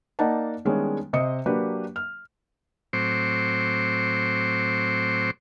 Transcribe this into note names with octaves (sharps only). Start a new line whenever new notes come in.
A#3 D#4 D5 D#5 F#5 A5
D#3 G3 G#3 B3 C#4 D4
C3 C5 D#5 D#6 C#7
F#3 A#3 D4 G4 B4
F6
A2 F#3 C4 C5 C#6 D6